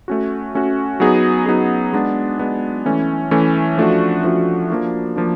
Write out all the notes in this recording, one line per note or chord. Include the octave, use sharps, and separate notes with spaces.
A3 C#4 F#4
A3 C#4 F#4
F#3 B3 D#4 G#4
F#3 B3 D#4 G#4
G#3 B3 D4
G#3 B3 D4
E3 A3 C#4
E3 A3 C#4
F3 A3 D4 F#4
F3 A3 D4 F#4
F3 A#3 D4
F3 A#3 D4